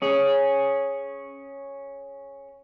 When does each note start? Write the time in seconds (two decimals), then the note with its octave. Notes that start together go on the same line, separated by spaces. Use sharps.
0.02 C#4 G#4